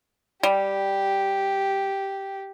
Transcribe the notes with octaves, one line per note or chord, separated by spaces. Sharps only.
G3 G4